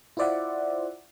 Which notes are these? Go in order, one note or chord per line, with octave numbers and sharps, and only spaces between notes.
E4 F4 C5 D5 E5 F#5